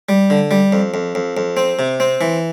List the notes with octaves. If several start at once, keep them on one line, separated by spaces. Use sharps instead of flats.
G3
D3
G3
F2
F2
F2
F2
C4
C3
C4
E3